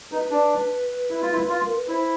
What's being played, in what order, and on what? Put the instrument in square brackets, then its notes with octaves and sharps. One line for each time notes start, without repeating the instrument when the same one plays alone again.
[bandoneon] D#4 [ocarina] B4
[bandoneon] D4
E4
F4
E4
F4
[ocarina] A#4
B4
[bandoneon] E4 [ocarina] C5